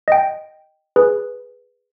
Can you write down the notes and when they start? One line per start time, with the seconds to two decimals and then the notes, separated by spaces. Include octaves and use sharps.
0.08 D#5 G5
0.96 G#4 B4